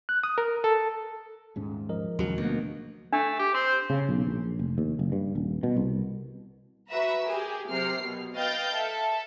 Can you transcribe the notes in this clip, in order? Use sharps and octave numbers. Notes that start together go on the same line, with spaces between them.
F#6
D#6
A#4
A4
D#1 G#2 C#4
F3 A#4 D#5
E1 D#2 G#2 C#3 F#3
D2 B2 A#3
A3 D4
G4
C4 C5
C#3
B1
A#1
F1
D#2
F#1
G2
D#1
B2
C2
F#4 B4 E5 A#5 E6
G4 G#4 A#4 G#5
C3 F#3 A#4 F6 C7
B2
B4 D#5 F5 G5 G6 A6
A4 E5